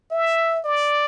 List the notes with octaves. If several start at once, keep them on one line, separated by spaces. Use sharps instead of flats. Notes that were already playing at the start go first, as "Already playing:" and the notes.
E5
D5